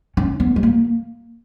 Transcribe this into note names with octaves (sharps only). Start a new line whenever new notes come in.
C#4
B3
G#3
A#3